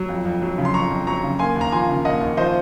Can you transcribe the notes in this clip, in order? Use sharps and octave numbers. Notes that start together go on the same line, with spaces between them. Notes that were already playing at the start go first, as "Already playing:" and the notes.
Already playing: F#3
F2
F2
F#3
C#3
C6
F2 A#5 C#6
F2
F#3 A#5 C#6
C#3
A#3 G#5 C6
D#2
A#5
F3 G#5 C6
C#3
A#3 D#5 F#5
D#2
F3 C5 D#5